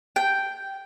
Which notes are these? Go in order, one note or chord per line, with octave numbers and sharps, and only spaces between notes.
G5